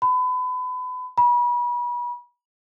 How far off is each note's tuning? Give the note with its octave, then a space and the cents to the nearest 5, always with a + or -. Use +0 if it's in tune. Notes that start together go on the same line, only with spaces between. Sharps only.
B5 +30
B5 -35